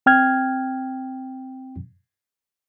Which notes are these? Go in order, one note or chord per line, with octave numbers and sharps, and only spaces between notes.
C4 G5 F6 G#6